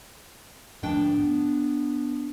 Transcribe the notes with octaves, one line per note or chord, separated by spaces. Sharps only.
G#2 F3 A3 D4 G5
B3